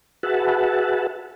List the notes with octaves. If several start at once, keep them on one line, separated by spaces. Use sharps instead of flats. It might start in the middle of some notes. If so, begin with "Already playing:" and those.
F#4 G#4 B4 E5 F#5 A5